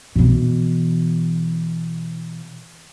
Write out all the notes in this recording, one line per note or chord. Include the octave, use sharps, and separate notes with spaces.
B2 E3